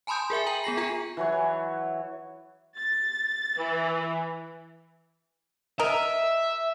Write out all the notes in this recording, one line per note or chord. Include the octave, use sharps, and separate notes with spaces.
G#5 A5 B5 C6 D#6 G6
G#4 A#4 E5 G#5
G5 A#5 F#7
B3 G#4 A#6 C7
F4 G#4 G#5 A#5
E3 F#3 C#5
A6
E3
A#4 D#5 E5